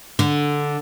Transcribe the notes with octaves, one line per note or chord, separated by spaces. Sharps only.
D3